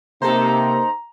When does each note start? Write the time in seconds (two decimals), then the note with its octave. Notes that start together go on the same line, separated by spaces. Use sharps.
0.22 C3 A#3 D#4 A4 C5 A#5